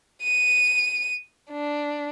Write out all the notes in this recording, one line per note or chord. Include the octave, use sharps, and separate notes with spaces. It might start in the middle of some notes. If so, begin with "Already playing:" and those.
D#7
D4